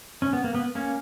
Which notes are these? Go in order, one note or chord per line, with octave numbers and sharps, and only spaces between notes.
C#4
B3
A#3
B3
A#3 C#4